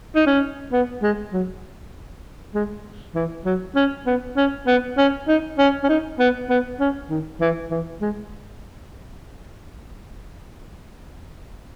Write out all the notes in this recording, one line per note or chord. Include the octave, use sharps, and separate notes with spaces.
D#4
C#4
B3
G#3
F#3
G#3
E3
F#3
C#4
B3
C#4
B3
C#4
D#4
C#4
C#4
D#4
B3
B3
C#4
D#3
E3
E3
G#3